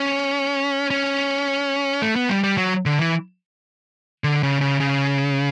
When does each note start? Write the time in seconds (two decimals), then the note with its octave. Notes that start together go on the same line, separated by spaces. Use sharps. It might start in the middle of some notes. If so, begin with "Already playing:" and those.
Already playing: C#4
0.91 C#4
2.02 A3
2.16 B3
2.29 G3
2.43 G3
2.57 F#3
2.86 D3
2.99 E3
4.24 D3
4.43 C#3
4.61 C#3
4.80 C#3